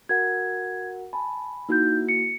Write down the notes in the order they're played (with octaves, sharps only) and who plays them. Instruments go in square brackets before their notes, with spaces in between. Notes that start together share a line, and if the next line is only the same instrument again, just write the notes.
[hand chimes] F#4 A#4 F#5 [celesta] G#6
[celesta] G#5 B5 [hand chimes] A5
[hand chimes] A#3 E4 F#4 [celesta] D#4 G6
[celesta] C#7